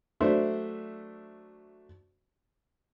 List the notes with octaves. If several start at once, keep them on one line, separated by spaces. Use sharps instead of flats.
F#3 A3 D4 C5 E5